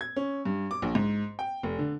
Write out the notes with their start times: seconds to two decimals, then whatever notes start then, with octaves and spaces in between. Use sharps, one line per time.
0.01 G#6
0.16 C#4
0.45 G2
0.71 D6
0.82 A#1
0.95 G#2
1.39 G5
1.63 F1
1.78 D3